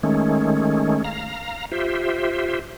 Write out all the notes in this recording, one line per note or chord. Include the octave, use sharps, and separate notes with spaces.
D#3 G#3 A3 C#4
F5 A#5
F4 G4 C5 E5